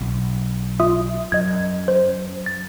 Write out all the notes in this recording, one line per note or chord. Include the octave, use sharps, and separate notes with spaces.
B1
F4 E5 D#6
F#2 D#5 G#6
C5
A6